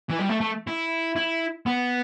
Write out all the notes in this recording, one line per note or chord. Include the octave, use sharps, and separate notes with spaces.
E3
G3
A3
A3
E4
E4
B3